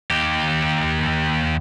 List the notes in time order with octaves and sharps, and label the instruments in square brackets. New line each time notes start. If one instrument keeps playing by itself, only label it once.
[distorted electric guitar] D#2 G4